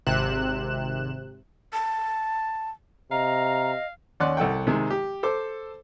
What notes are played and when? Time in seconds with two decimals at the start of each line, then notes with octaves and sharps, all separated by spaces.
0.07 G#1 C3 F#6 E7
1.73 A5
3.11 C3 D#5 F5 A#5
4.20 D#2 C#4 D5 F#5 C6 F#6
4.37 C2 A4 F#5 G5
4.67 C3 D#3 G#3
4.90 G4
5.23 A4 C5 D6